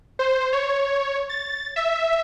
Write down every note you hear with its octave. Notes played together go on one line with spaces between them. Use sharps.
C5
C#5
A6
E5